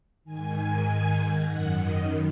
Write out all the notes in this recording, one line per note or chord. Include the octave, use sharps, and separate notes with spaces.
G#2 D#3 G#5
F#2 D#3 F#5
D#5